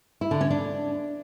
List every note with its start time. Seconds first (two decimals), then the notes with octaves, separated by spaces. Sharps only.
0.21 E4
0.31 D3
0.41 C#4
0.50 D4